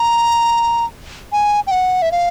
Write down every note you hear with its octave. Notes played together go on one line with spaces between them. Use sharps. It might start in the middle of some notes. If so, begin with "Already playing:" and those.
Already playing: A#5
G#5
G5
F#5
E5
F5